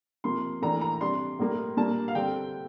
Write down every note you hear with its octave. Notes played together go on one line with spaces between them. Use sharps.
C3 F3 A#3 C6
A2 E3 A#3 D4 A#5
A#5
C3 G3 D4 C6
A2 G3 A#3
A#2 G3 A#3 D4 A5
F5
D3 G3 C4 G5